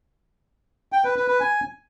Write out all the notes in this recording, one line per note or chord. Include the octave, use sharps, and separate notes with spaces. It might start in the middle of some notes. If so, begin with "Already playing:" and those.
G5
B4
B4
B4
G#5